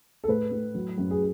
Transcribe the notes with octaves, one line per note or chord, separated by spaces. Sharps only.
A4
A2 B4
A2
F#3
F#2
G#4